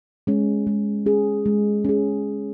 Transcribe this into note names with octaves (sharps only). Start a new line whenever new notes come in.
G#3 C#4
G#3
C#4 G#4
G#3
C#4 G#4